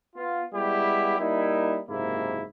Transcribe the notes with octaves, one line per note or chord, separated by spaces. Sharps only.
B3 F4
G3 G#3 B3 E4 G4
G3 A#3 D#4 E4
F#1 G#2 C3 A#3 E4